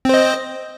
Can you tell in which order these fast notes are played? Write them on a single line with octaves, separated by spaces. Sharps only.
C4 C5 D#5